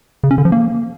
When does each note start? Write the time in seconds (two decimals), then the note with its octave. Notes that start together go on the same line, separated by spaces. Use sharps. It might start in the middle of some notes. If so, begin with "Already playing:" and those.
0.23 C#3
0.31 C#4
0.38 D3
0.45 F3
0.52 A#3